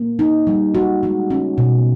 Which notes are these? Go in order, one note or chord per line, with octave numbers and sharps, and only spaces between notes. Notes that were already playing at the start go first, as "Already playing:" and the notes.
Already playing: A#3
D#4
G3
F#4
G#3
C#4
B2